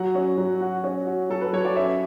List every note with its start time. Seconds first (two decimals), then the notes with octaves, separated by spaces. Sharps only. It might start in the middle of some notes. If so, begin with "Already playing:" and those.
Already playing: F#3 F#5
0.15 C#4
0.38 F#3
0.61 F#4
0.84 C#4
1.07 F#4
1.30 F#3 A4
1.41 B4
1.53 F#3 C#5
1.65 D5
1.76 C#4 E5